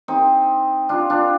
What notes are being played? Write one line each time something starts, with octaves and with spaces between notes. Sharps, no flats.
C4 D#4
D4 F4
D4 F4